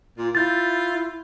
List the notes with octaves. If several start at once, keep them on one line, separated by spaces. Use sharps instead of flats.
A#2 F4
E4 F4 G6 A6